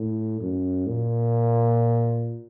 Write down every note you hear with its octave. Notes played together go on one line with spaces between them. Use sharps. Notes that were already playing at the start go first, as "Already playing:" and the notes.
Already playing: A2
F#2
A#2